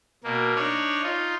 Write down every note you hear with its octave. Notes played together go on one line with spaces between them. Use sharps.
B2 A#3
D4 D#4 C#5
D#4 F4